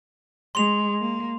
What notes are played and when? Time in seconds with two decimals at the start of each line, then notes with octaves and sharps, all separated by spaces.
0.55 G#3 C6 F7
1.01 A#3